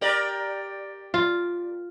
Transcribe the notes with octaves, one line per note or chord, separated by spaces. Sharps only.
G4 A#4 D5
F4